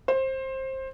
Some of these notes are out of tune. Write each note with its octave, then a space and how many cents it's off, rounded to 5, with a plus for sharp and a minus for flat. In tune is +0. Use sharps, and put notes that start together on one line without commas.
C5 +20